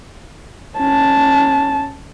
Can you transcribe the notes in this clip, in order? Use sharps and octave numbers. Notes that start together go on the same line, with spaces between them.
C#4 A5